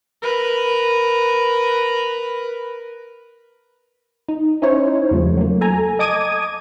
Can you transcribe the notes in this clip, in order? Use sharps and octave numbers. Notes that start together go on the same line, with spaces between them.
A#4 B4
D#4
C#4 D#4 E4 C5 C#5
E2 C#3 F3 G3 A3
F#3 A3 A#3
A4 G#5 A#5
D#5 A5 D6 D#6 G#6 D#7